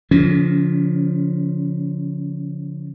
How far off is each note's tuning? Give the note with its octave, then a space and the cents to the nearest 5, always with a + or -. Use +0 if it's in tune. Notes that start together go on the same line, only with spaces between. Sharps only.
D3 -45 F3 +0 C#4 +25